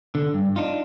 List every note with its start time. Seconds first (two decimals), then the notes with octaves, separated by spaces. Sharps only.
0.15 D3
0.34 G2
0.56 D4 D#4 F4